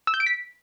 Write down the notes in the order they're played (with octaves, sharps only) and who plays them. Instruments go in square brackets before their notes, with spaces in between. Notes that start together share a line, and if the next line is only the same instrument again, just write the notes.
[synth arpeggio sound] E6
G6
D7
B6